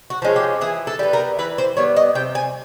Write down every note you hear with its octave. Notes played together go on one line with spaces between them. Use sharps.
F#4
F3 G#3 C#4
G4
E3 G#4
A4
G3 B3
A#4
E3 B4
C5
G3 B3 C#5
D#5
C3 G5
G#5